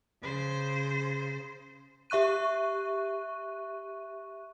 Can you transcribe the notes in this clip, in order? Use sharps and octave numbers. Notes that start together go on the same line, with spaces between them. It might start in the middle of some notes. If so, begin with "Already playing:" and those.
C#3 C5
G4 E5 C#6 F#6 D#7